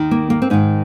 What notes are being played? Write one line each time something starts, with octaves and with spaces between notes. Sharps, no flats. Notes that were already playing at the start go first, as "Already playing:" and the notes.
Already playing: D#2 D#3
A#3
A#3
C4
G#2 D#3 D#4